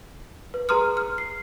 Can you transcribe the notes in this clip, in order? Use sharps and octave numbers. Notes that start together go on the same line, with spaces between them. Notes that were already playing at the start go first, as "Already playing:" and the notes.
B4
G#4 B4 A#5 C6 D#6 F6
F6
C7